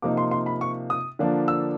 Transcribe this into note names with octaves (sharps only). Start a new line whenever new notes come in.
C3 F3 A#3 D#4 D6
C6
C6
B5
C#6
D#6
D3 F3 A#3 D4
E6